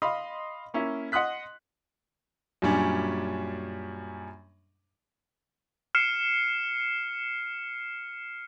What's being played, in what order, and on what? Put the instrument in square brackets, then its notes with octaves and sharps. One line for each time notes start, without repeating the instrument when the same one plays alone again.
[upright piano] D#5 F5 B5 C6 D#6
A#3 C#4 E4
D#5 F#5 C6 D#6 F#6 B6
[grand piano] F#2 A#2 G3 C#4 D4
[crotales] F6 C7 C#7 E7